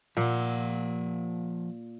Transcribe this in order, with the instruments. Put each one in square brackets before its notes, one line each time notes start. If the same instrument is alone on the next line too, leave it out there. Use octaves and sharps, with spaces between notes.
[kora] A#2 [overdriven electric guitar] F3 F#5